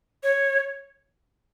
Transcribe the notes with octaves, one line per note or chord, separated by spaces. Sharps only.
C#5